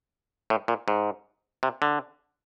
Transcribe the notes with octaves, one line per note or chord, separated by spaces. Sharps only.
A2
A#2
G#2
C3
D3